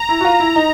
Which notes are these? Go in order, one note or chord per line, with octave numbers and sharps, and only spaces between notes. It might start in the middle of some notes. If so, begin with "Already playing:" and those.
Already playing: A#5
E4
F#4
F4
E4
D#4